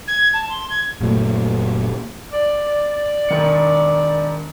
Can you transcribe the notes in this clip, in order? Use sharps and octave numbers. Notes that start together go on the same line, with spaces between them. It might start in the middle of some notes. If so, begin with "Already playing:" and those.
G#6
A5
C6
G#6
F#1 A#2 F#3 A3
D5
E1 D#3 C#7